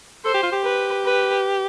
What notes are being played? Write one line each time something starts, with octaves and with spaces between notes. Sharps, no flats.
A4 C5
G4
F4
G4
B4
B4